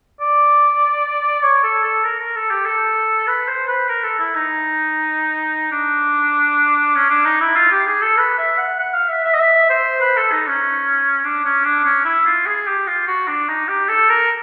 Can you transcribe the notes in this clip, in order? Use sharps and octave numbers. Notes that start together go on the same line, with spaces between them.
D5
C#5
A4
A4
A#4
A#4
A4
G4
A4
B4
C5
B4
A#4
A4
E4
D#4
D4
C#4
D4
D#4
E4
F4
G4
G#4
A4
B4
E5
F#5
F#5
F5
E5
E5
D#5
E5
C5
B4
A4
D#4
C#4
D4
C#4
D4
C#4
E4
F4
G#4
G4
F4
F#4
D4
D#4
G4
A4
A#4